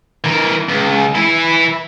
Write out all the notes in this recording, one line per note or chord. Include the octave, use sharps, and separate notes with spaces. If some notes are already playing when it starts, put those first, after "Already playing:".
E3 A#4
C#2
E3 E4